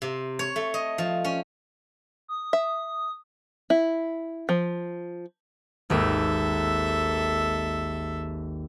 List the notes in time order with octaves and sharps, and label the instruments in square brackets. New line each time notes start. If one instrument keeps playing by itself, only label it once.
[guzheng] C3
C#5
A3
D#5
F3
C#4
[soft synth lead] D#6
[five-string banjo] E5
E4
F3
[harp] G#1 D#2 [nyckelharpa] A4 E5